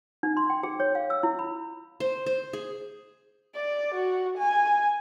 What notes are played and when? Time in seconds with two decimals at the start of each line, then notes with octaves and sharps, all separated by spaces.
0.23 D#4
0.37 C6
0.50 G5
0.63 G#4
0.80 C#5
0.95 F5
1.10 E6
1.23 E4
1.39 B5
2.00 C5
2.26 C5
2.53 G#4
3.55 D5
3.95 F#4
4.38 G#5